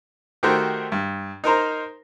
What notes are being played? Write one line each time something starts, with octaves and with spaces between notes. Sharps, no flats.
D#3 A3 F#4 G4 A#4 C5
G2
D#4 A#4 C5 A#5